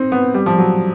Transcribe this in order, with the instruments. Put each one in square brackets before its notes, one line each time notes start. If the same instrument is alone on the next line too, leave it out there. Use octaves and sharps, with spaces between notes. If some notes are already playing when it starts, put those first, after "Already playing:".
Already playing: [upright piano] C4 D#4
B3
G3
F3
F#3